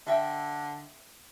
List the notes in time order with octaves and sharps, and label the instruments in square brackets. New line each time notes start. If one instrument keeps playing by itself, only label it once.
[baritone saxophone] D3 [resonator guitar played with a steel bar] D#5 E5 G5